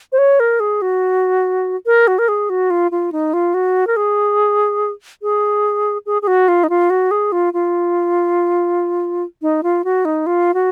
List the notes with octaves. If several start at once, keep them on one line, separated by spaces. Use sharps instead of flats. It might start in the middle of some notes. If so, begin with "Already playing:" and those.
C5
C#5
A#4
G#4
F#4
A#4
F#4
A#4
G#4
F#4
F4
F4
D#4
F4
F#4
A#4
G#4
G#4
G#4
G#4
F#4
F4
D#4
F4
F#4
G#4
F4
F4
D#4
F4
F#4
D#4
F4
F#4